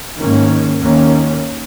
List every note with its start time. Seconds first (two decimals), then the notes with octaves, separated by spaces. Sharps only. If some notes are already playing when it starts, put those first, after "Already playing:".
0.17 G#2 D#3 A#3 C#4
0.81 D#2 D#3 A#3 C#4